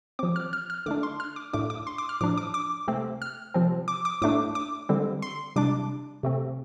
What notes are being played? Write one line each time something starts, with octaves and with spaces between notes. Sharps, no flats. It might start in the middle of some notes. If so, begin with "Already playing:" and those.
F3 C4 D6
F6
F6
F6
D3 A3 D4 D6
C6
F6
D6
A2 A3 D4 D6
D6
C6
D6
F6
A2 F3 D4 D6
D6
D6
C3 A3 C4
F6
C3 F3 C4
D6
D6
A2 A3 D4 D6
D6
D3 G3 C4
C6
C3 G3 D4 D6
C3 A3 C4